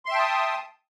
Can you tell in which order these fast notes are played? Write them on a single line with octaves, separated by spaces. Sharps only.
C6 E5 G5 A5 D#6